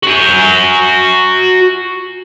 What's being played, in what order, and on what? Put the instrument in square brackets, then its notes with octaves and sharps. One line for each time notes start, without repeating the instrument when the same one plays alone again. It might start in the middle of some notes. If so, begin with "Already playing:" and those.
[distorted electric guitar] F#4 G#5